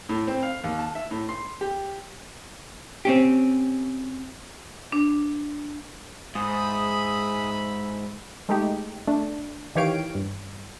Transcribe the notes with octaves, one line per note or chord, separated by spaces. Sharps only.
A2
C4
F5
D#2
A5
E5
A2
C6
G4
C4 C#4 G4
D4
G#2 G#4 E5 B5 D#6
G#3 A3 D#4 G4
A3 D4
D#3 E3 G4 C#5 F5 D7
G2